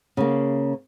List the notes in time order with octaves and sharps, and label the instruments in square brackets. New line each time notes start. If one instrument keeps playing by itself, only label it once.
[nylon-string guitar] C#3 A#3